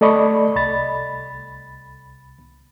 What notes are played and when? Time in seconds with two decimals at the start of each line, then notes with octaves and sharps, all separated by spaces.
0.01 A3 A4 D5 D#5 B5 C#6
0.56 C2 B5 A6